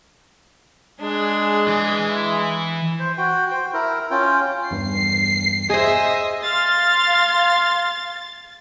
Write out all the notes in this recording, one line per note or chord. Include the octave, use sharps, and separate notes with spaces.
G#3 D4 G#4
E3
E4
C5
F#4 G5
C5 G5
E4 A#4
C#4 F4 G5
E2 G2 C7
G#4 C5 D#5 E5
F5 C6 A6